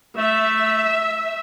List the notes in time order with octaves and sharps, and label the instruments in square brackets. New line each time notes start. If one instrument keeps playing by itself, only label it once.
[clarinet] A3 [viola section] E5